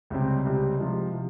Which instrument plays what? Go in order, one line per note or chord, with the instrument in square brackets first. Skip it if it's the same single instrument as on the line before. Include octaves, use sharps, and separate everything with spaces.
[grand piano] C#2 C3 G3 C4
C#2 C3 G3 C4
C3 F3 G#3
C3 F3